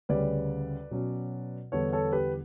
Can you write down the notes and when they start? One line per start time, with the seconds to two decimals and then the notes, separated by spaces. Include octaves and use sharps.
0.09 D2 C#3 G3 B4 D5
0.91 B2 F#3 C#4
1.72 E2 D3 G3 B3 D4 A4 C#5
1.92 A4 C#5
2.12 G4 B4